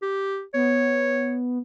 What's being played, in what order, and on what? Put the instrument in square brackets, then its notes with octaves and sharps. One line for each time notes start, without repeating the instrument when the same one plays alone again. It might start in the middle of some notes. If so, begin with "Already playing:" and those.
[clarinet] G4
[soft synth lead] B3 [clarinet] C#5